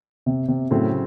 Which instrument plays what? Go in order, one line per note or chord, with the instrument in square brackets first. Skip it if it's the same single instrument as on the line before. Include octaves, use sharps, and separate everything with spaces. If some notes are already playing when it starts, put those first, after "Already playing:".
[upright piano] C3
C3
[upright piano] A2 [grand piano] C#3 F#3 C4